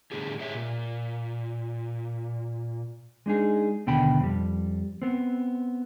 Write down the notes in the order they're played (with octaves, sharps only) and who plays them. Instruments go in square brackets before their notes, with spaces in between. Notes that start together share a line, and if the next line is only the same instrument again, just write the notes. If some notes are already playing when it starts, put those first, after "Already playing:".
[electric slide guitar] A2 D3 G4 G#4
G4 G#4 C#5 E5
A#2
[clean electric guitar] G#3 D4 D#4 G#4
D#2 B2 D3 G5 B5
F2 G3
B3 C4